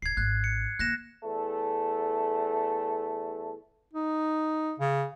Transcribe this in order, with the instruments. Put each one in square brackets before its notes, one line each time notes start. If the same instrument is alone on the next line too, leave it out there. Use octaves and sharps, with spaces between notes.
[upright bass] D1 [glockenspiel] G#6 C7
[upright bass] G#1 D4 [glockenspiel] F#6
[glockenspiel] C#7
[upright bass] D#3 A#3 [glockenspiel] F#6 A#6 E7
[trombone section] E2 A3 A4
[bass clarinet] D#4
C#3